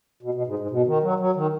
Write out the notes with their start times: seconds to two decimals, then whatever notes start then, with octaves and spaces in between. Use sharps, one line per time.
0.23 B2
0.34 B2
0.47 G#2
0.59 G#2
0.71 B2
0.87 D#3
1.03 F#3
1.20 F#3
1.36 D#3